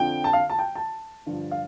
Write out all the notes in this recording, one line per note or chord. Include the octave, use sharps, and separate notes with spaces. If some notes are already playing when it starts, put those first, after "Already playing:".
Already playing: F2 D3 F3 G5
A5
F5
A5
G5
A5
G2 D3 F3
F5